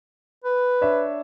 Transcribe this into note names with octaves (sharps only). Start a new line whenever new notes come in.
B4
D4 C#5 E5